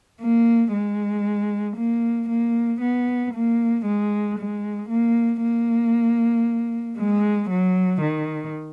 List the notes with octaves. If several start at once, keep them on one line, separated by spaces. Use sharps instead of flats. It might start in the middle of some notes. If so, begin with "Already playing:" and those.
A#3
G#3
A#3
A#3
B3
A#3
G#3
G#3
A#3
A#3
G#3
F#3
D#3